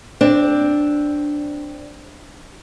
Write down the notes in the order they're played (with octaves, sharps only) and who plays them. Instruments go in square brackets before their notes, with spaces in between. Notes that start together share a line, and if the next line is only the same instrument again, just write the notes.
[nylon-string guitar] C4 D4